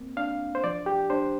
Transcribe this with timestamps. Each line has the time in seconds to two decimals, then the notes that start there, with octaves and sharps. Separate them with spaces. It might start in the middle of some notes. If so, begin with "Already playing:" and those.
Already playing: A#3 C4
0.17 D4 F5
0.55 C5
0.64 F3 D5
0.86 G4
1.10 D4 C5